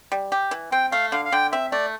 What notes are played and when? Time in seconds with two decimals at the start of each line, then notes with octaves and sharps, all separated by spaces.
0.12 G3
0.32 G4
0.51 E3
0.72 C4 G5
0.92 A3 F5
1.12 D3 F5
1.25 F5
1.32 D3 G5
1.52 C4 E5
1.72 A3 D5